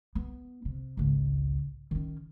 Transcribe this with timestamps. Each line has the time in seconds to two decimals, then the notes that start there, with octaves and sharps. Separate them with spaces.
0.15 B3
0.65 C3
0.97 G#1 C#2
1.91 D#3 C#4